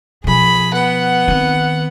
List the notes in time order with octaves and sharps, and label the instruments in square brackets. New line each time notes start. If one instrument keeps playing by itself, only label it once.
[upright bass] B2 F3 [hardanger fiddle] G#4 B5
[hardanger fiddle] B3 F#5
[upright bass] D#3 C4